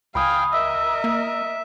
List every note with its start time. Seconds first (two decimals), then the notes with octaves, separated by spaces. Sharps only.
0.15 C#2 F5 G5 G#5 B5 D#6
0.53 A#4 D#5 E5 E6
1.04 A#3